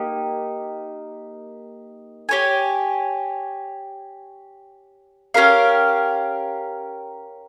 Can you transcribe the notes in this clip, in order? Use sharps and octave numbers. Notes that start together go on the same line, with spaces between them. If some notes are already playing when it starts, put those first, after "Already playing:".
Already playing: A#3 D#4 G4
G4 C#5 G#5
C#4 G4 A#4 F5